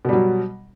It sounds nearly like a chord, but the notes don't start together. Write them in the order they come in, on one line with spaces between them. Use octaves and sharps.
B2 G3 F#3